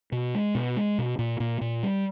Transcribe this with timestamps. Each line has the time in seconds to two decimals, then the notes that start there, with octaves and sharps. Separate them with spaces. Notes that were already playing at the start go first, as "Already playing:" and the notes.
0.12 B2
0.35 G#3
0.55 B2
0.77 G#3
0.98 B2
1.19 A#2
1.40 A#2
1.61 A#2
1.83 G3